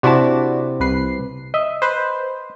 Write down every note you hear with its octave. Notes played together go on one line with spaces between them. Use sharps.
C3 D4 E4 F#4 D5 A5
C2 B4 C7
D#5 E5
B4 C5